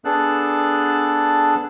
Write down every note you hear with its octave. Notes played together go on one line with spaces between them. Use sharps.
B3 D4 G#4 A4 A5 F#6